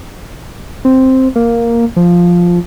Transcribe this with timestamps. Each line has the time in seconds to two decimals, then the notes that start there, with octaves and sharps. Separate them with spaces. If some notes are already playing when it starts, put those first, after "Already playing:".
0.85 C4
1.36 A#3
1.96 F3